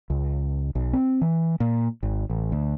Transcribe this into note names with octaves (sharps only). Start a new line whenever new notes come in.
C#2
B1
C4
E3
A#2
G#1
A1
D2